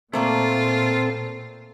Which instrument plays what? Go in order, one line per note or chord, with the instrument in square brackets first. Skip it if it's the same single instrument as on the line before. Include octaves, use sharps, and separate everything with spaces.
[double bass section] A#2 [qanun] A3 A#3 D5 [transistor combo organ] C4 A4 [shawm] F4